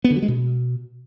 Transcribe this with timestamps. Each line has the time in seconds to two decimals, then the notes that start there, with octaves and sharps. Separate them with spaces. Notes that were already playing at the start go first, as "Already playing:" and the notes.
0.04 B3
0.10 D3
0.16 F#3
0.22 G#3
0.28 B2